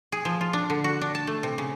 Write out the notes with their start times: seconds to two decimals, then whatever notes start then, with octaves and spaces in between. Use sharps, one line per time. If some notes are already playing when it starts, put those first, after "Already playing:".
0.12 G#4
0.25 F3
0.41 F4
0.53 D4
0.70 D3
0.84 F#4
1.01 D4
1.15 A5
1.27 A3
1.43 C3
1.58 C#3